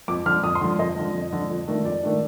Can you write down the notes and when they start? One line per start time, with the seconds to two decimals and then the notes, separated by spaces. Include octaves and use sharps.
0.08 F2 D6
0.26 D3 F3 F6
0.43 F2 D#6
0.55 C6
0.61 D3 F3
0.78 F2 D#5
0.96 D3 F3
1.14 F2
1.32 D3 F3
1.50 F2
1.68 D#3 A3 D4
1.85 F2 D5
2.03 D#3 A3 D4